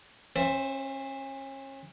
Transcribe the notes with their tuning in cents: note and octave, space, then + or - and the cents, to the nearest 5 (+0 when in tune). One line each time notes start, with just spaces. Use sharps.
C#4 -35 C5 +0 E5 +0